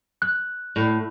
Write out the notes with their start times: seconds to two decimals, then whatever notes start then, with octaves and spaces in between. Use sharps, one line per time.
0.22 F#6
0.76 A2